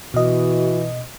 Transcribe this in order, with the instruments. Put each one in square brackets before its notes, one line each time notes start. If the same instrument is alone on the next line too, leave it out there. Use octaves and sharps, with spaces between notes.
[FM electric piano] B2 D#5 [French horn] E3 [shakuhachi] F#4